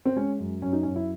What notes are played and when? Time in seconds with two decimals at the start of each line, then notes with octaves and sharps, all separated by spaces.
0.05 C4
0.16 G#3 C#4
0.39 F#2
0.62 F#2 C#4
0.73 D#4
0.83 F#2 C#4
0.96 E4